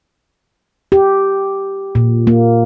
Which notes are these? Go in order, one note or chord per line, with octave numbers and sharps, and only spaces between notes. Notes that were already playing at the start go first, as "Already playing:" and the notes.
G4
A#2
A#3